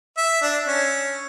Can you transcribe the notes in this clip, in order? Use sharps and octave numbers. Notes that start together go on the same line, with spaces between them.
E5
D4
C#4